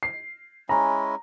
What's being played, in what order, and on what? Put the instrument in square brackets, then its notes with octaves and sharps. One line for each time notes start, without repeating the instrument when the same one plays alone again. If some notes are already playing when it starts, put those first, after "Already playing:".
[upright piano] C7
[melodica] G#3 C#4 E4 [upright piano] A#5